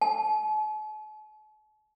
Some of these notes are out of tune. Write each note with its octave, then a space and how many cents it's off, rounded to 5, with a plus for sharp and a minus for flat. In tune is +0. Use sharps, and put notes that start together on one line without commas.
A5 -45